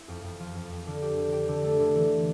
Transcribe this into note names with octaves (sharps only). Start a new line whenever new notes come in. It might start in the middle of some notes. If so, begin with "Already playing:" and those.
Already playing: E4
F2
F2
F3
F2
F2
D3
G4
D3
G4
D3
A3
D3
E3